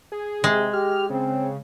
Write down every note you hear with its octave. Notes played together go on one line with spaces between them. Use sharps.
G#4
C3 G#3
G4 F6
C#3 C4